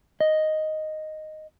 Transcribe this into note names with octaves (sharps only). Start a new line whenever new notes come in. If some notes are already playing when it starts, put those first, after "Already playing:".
D#5